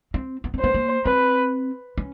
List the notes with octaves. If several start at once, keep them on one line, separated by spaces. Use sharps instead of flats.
C4
B3
C4
B3 C5
A#3
C4 B4
C#4